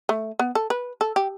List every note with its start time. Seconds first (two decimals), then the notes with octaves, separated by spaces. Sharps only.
0.09 A3
0.39 B3
0.55 A4
0.70 B4
1.01 A4
1.16 G4